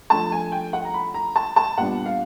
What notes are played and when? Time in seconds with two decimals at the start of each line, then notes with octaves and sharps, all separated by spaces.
0.10 F3 A3 D4 A5
0.32 G#5
0.52 G5
0.73 F#5
0.85 A#5
0.94 B5
1.14 A#5
1.36 A5
1.56 A5
1.77 A#2 G3 B3 D4 F#5
2.06 F5